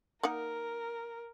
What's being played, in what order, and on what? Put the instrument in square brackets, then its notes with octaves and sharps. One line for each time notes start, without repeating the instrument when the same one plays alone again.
[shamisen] A#3 D#4 F#5 [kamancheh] A#4